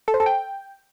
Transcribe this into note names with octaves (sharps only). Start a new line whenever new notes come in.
A4
C5
A4
G5